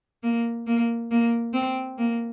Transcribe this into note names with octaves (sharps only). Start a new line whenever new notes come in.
A#3
A#3
A#3
C4
A#3